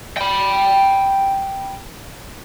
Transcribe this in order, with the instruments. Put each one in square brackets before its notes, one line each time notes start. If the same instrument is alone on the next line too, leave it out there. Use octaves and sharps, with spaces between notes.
[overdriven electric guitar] G5 B5